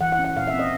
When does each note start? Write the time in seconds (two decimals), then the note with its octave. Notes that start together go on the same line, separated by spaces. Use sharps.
0.01 E3 F#5
0.12 F#5
0.19 C#4
0.25 F#5
0.37 A#2 F5
0.47 E5
0.54 C4
0.59 D#5